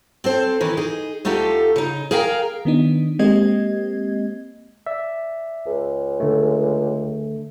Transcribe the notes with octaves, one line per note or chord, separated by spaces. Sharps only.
C4 A4 C5
D#3 E3
D#4 G#4
D2 A3 D#4 F4 G4 A4
C#3 D#4
G#4 A#4 F5 G5 A5 A#5
D#3 B3 D4 D#4
G#3 A#3 C4 G4 D#5 G#6
D5 E5
C#2
D3 A3